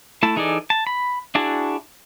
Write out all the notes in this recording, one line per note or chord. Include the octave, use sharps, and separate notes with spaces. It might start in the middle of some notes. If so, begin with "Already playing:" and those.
A3 E4 A5
E3 D#4 G#4 A4 D5
A5
B5
D4 E4 F#4 G#4 A5